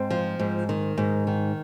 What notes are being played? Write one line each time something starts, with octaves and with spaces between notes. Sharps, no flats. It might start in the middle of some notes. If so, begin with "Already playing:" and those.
Already playing: G#2 C4
F3
G#2
D#3
G#2
D#3